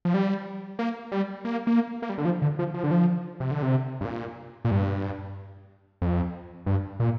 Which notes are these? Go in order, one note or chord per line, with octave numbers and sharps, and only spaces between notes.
F3
G3
A#3
G3
A#3
A#3
A#3
G3
D3
F3
D3
F3
F3
D3
F3
C3
D3
C3
G2
A#2
A#2
G2
F2
G2
A#2